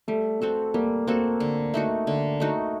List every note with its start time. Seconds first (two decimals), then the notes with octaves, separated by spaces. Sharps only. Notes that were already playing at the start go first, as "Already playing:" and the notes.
0.08 G3 A3
0.41 A3 C4 F#4 A4
0.74 G3 A#3
1.07 A#3 C4 F#4 A4
1.40 D3
1.74 A3 D#4 F#4
2.07 D3
2.40 A3 D#4 F#4